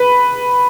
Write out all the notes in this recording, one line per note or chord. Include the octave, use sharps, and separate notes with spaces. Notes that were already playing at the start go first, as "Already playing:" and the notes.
Already playing: B4